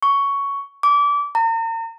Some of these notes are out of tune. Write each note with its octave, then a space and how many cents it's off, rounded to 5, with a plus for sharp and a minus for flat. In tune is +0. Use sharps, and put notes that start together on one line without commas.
C#6 +10
D6 -25
A#5 -40